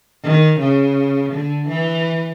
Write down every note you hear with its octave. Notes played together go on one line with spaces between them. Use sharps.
D#3
C#3
D3
E3